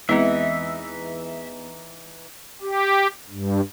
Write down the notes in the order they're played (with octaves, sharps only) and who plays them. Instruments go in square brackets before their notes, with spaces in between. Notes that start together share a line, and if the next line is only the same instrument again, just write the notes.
[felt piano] E2 [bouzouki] E3 D#4 [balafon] G#3 C4 [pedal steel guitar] E5
[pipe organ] G4
G2